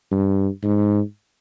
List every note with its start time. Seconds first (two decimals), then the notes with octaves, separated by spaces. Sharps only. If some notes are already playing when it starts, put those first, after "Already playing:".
0.11 G2
0.63 G#2